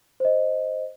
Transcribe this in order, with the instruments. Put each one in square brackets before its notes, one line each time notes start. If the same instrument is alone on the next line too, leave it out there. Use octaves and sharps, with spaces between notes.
[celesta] C5 D#5